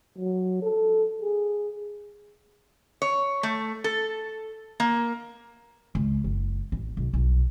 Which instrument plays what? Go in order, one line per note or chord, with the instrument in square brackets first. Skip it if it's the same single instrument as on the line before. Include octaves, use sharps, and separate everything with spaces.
[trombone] F#3
A4
G#4
[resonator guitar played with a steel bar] C#5
A3
A4
A#3
[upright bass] C#2
F#1
A1
B1
B1